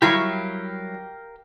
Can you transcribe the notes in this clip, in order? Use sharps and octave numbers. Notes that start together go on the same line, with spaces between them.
F#3 G3 E4 G4 A#4 F5